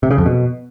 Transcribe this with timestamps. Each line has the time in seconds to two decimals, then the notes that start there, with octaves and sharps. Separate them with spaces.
0.03 C3
0.10 C#3
0.18 F2
0.26 B2